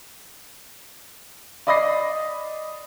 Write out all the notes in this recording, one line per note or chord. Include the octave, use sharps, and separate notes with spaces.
D5 D#5 B5 D#6 A#6 C7